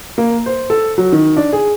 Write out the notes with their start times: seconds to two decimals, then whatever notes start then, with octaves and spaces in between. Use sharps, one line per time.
0.18 A#3
0.46 C5
0.70 A4
0.98 F#3
1.12 D#3
1.37 D4
1.53 G#4